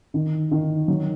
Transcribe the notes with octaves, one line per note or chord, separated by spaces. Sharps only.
D#3
D#3
F#3